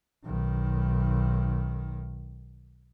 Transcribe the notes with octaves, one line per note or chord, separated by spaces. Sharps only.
B1 D#3